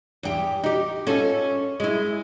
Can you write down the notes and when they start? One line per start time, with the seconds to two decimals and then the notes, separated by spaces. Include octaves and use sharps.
0.23 E2 G4
0.64 D#4 G4
1.07 C#4 F4 A4
1.80 G#3 E4